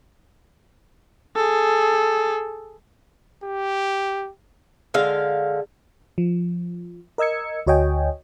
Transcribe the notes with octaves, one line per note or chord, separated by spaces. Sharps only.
G#4 A4
G4
D3 G#3 F5
F3
A#4 D#5 E6 G#6 C#7
D2 F#4 C#5 D#5 G5 G#5